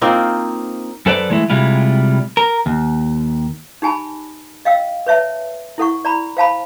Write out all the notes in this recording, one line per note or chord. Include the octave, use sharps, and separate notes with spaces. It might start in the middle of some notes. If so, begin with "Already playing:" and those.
A#3 C4 D#4 F4
F#2 A4 B4 C5 D5
E3 G#3 A3 E4
C3 G3 G#3 E4 F4
A#4
D#2
D#4 G4 G#5 A5 B5
D#5 F5 G5 E6
B4 C#5 E5 A5
E4 A4 F#5 C#6
D5 A#5 B5
C5 F5 A5 B5